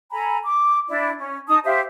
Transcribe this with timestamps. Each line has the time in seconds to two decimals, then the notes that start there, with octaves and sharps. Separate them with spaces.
0.12 A4 G#5 A#5 B5
0.45 D6
0.88 D4 E4 D5
1.18 C#4
1.48 D#4 A5 D#6
1.64 G4 C5 E5 F5